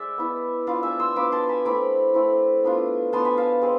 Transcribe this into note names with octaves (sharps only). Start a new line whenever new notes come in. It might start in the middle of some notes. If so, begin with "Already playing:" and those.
Already playing: G#3 D5 E5
B3 E4
B3 D4 F4 D5 F5
E5 G#5
C6 E6
B3 D4 F4 B5 D6
A5 C6
G#5 B5
A3 C4 E4 B5 D6
A3 C4 E4
B3 D4 F4
B3 D4 F4 A5 C6
G#5 B5
F5 A5
G#3 C4